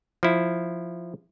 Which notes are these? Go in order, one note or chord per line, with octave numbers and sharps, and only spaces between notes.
F3 E4